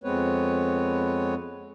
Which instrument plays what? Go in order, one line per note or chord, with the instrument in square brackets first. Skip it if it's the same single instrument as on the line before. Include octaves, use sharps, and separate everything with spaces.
[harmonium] F2 G#3 B3 C4 B4 C#5